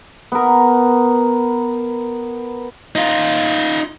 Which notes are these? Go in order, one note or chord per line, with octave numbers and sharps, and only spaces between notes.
B3 A#4
D#4 F4